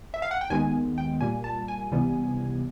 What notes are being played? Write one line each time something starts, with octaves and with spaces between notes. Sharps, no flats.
E5
F5
F#5
G5
D#2 D#3 G#3 B3 G#5
G5
A#2 G3 A#3 G#5
A5
G#5
C#2 C3 E3 G3 B3